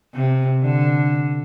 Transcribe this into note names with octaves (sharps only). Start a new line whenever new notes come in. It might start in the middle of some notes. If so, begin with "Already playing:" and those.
C3
D3